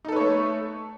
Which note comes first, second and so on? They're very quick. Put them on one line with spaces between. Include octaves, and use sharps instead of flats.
D#4 A4 B4 C#5 A3